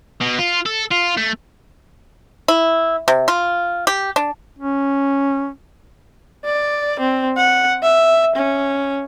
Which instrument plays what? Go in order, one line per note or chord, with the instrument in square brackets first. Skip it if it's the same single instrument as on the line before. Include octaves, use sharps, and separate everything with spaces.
[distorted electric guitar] B2
F4
A4
F4
A3
[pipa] E4
C3
F4
G4
D4
[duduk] C#4
[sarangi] D5
C4
F#5
E5
C#4